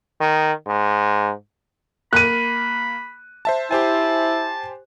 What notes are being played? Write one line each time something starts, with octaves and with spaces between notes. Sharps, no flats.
D#3
G#2
A#3 A#4 B5 F#6 D#7
C5 E5 A5
E4 G4 C5 G#5 A5